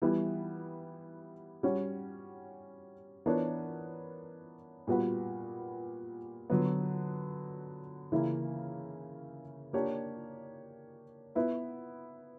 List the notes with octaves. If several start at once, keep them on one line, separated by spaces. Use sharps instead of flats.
E3 G3 B3 E4
G3 C#4 F#4 C#5
E3 B3 D4 A#4 C#5
A#2 G3 B3 F#4 B4
D3 F#3 B3
C#3 E3 A#3 E4
A#3 D4 G4 C#5
B3 E4 B4